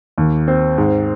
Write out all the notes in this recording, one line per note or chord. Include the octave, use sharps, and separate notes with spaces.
D#2
C4
G#2